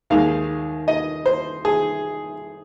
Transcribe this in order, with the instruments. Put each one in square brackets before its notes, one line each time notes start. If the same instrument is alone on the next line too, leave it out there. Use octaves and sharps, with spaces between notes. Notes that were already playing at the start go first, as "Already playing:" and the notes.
[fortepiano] D#2 D#3 G#3 F5
D#5
C5
G#4